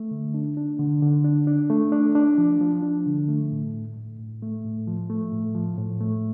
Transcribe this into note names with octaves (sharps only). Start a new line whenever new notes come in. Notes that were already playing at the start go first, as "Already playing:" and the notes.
Already playing: A3
D3
D4
D4
D3
D3
D4
D4
A3
D4
D4
F3
F3
D4
D3
A3
A2
A2
A2
A2
A3
A2
F3
A3
A2
F3
A2
A3